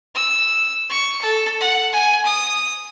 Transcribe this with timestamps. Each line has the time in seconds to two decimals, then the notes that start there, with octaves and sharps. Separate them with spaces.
0.15 E6
0.89 C#6
1.22 A4
1.60 F#5
1.93 G#5
2.25 D#6